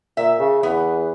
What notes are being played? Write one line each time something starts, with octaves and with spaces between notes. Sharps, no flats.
A#2 E5
C#3
E2 B3